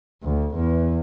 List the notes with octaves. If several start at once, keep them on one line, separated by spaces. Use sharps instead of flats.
D2
E2